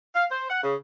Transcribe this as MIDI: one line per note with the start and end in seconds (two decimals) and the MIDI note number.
0.15 0.25 77
0.31 0.46 72
0.49 0.62 78
0.63 0.75 49